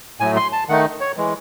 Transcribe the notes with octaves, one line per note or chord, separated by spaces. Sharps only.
A2 F#3 A3 G#5
C6
A5
D#3 A3 D#4 F#5
C#5
E3 G#3